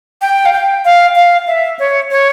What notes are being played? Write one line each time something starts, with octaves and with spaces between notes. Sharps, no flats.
G5
F5
G5
F5
F5
E5
C#5
C#5